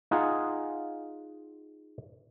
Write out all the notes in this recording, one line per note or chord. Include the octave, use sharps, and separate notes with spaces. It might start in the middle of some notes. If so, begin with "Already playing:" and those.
D#4 F4 G#4 F#5